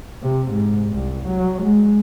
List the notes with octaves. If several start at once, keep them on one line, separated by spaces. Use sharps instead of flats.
C3
G#2
C2
F#3
G#3